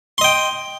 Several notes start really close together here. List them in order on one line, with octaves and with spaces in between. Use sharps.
C6 D#5 G5